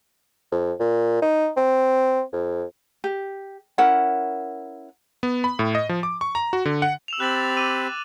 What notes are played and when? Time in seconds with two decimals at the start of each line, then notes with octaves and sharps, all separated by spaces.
0.52 F2
0.80 A#2
1.22 D#4
1.57 C4
2.33 F2
3.04 G4
3.78 C#4 E4 A#4 F#5
5.23 B3
5.44 B5
5.59 A2
5.75 D#5
5.89 F3
6.03 D6
6.21 C#6
6.35 A#5
6.53 F#4
6.65 D3
6.82 F#5
7.08 E6 E7 F7
7.20 C4 G4 B5 F#6 A6 F#7
7.36 A6
7.57 D6 E6 D#7